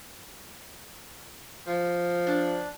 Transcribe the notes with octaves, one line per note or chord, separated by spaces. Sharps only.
F3
D4